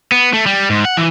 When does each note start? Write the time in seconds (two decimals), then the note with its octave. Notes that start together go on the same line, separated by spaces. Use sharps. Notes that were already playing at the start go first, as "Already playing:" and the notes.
0.12 B3
0.34 A3
0.46 G3
0.70 G#2
0.85 F#5
0.97 E3